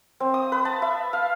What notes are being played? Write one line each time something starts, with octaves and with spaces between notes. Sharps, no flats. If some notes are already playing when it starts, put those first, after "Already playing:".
C4
D#6
B4
A5
E5
F5